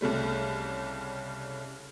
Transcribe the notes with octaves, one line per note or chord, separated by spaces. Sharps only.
C2 C#3 G3 A3